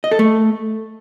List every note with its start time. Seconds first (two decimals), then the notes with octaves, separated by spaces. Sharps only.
0.04 D#5
0.11 A4
0.19 A3